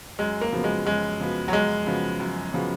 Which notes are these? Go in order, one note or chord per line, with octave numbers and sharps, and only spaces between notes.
F#2 G#3
A#3
C#3 F3 B3 F#4
G#3
F#2 G#3
C#3 F3 B3 F#4
F#3
F#2 G#3
C#3 F3 B3 F#4
F#2
C#3 F3 B3 F#4